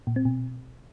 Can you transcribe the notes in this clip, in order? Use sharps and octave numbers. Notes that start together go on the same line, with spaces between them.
A#2
C4
B2